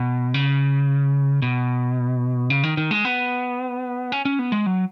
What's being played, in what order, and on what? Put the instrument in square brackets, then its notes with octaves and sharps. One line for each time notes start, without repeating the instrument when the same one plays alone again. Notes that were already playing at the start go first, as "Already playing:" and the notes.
Already playing: [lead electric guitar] B2
C#3
B2
C#3
D#3
D#3
G#3
B3
C#4
C#4
B3
G#3
F#3